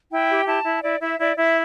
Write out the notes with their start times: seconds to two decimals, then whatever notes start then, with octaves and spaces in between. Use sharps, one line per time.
0.11 E4 G5
0.29 G4
0.47 E4 A5
0.64 E4
0.83 E4 D5
1.00 E4 E5
1.19 E4 D5
1.37 E4 E5